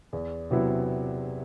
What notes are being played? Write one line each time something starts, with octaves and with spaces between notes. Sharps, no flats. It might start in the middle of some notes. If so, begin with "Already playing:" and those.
E2
C3 F#3 B3 E4